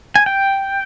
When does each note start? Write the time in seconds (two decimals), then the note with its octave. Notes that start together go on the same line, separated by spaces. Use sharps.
0.16 G#5
0.26 G5